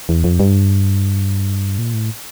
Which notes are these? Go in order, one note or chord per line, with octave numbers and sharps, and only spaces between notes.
E2
F2
G2
A#2
A2